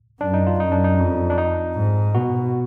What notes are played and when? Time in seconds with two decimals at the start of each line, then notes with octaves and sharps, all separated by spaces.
0.20 F#2 D4
0.34 D#4
0.47 F4
0.60 F#2 D#4
0.72 D4
0.84 D#4
0.99 F2
1.30 D4
1.38 D#4
1.76 G#2
2.14 B2 F#4